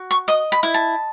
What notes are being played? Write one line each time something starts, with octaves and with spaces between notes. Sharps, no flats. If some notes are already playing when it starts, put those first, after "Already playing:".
Already playing: F#4
C#6
D#5 D#6
B5
E4
A5